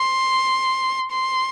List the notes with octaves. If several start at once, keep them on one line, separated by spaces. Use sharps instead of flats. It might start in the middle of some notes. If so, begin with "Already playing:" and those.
Already playing: C6
C6